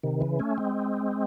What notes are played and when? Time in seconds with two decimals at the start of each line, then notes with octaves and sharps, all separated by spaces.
0.03 C3 D#3
0.21 C#3 E3
0.39 A3 C#4
0.58 G#3 C4